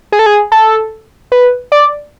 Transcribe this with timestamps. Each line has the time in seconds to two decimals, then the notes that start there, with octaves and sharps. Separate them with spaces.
0.12 G#4
0.19 A4
0.26 G#4
0.52 A4
1.32 B4
1.72 D5